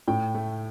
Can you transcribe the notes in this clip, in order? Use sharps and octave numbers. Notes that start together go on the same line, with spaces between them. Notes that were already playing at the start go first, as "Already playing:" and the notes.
A2 G5
A3